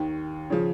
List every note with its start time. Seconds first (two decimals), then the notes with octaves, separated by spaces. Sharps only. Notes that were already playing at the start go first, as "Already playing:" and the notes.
Already playing: D#2 D#3
0.50 C#3 F3